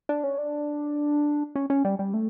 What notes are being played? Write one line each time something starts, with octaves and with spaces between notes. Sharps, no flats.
D4
C#4
D4
C#4
C#4
G3
G3
A3